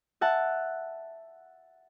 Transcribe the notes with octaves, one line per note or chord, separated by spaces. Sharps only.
E5 F#5 A5